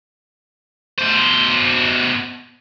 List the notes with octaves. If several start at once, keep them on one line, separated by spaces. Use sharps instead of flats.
B2 C5